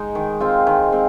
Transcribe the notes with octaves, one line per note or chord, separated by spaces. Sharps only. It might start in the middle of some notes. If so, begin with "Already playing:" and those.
Already playing: G#3 D#4
D#3
G#3 C4 F4
D#3
G#3 C4 F4